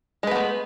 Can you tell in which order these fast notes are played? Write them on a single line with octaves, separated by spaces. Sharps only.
G#3 B4 B3 A3